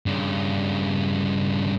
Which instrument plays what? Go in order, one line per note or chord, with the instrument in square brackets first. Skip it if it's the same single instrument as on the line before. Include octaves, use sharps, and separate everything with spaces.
[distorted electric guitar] G2 C#3